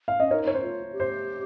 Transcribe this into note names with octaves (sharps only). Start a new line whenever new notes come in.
F5
C#4 D#5
D#4 A#4 C#5
C#5
C5
F4
G4
C5